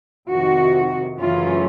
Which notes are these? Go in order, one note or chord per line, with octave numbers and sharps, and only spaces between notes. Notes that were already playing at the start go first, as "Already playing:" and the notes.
F2 C3 D#3 F#4
F#2 C#3 E3 A3 C#4 F4